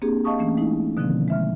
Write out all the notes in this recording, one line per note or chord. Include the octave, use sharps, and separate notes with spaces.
A#3 C4 D4 G4 G#4
D#5 F5 A5 C#6 D#6
E3 A3 A#3 C#4
G#3 A3 D#4 E4
B2 D3 D#3 F3 A#3 C4
G#3 E5 F6